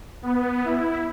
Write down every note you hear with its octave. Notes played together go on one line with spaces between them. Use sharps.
B3
E4